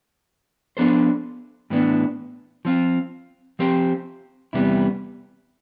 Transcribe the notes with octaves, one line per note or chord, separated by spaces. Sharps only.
F3 B3 D4 A4 C5
A2 E3 B3 D4
F3 C4 F4
F3 C4 G4 C5
E2 C3 G3 B3 E4